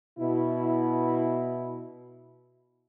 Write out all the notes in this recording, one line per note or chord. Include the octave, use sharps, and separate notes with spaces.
B2 E4